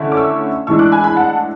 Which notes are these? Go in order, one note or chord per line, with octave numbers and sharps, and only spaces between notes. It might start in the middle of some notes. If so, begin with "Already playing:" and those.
Already playing: D3 A3 C#4 E4
D6
C#6 E6
A2 E3 G#3 D4 C#6 E6
D6 F#6
G#5 B5
G#5 B5
F#5 A5